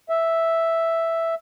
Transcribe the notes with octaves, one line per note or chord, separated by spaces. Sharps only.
E5